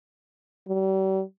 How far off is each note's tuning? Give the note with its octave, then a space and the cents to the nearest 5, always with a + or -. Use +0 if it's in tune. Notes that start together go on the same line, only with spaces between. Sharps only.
G3 -40